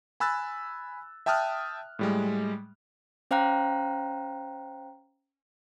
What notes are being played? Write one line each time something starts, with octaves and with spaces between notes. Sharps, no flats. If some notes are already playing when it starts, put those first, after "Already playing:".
G#5 B5 E6 F#6 A6
E5 G5 A5 D#6 F6 F#6
A2 G3 G#3
C#4 C5 F5 G5 A#5 F#6